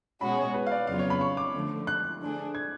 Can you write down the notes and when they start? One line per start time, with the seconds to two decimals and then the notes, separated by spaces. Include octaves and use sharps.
0.21 B2 G#3 C#4 F#4 B5
0.38 C#5
0.54 B4
0.67 F5
0.71 D5
0.87 F2 C#3 F#3 B3 F4 F5
0.99 C#5
1.10 B5
1.21 C#6
1.37 D6
1.54 D3 F3 A3
1.87 F#6
2.21 D3 F3 A3 D4 G#4
2.55 G#6